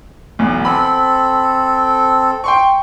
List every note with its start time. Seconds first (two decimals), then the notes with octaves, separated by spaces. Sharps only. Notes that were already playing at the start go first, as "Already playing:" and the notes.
0.39 B1 E2
0.65 C4 A4 B5
2.44 G5 C6 C#6